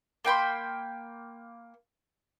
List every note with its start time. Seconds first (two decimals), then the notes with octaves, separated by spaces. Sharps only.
0.25 A#3 G5 B5 C6